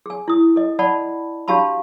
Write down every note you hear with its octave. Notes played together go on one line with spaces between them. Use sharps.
G#4 G#5
E4 D#6
A4 D#5
D5 F#5 A5 B5
D4 F#4 G4 F5 A5 B5